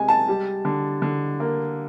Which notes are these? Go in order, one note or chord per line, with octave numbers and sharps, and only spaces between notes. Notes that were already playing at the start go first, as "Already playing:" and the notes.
Already playing: C3 G#3 G#5
A5
G3
D3
D3
A#3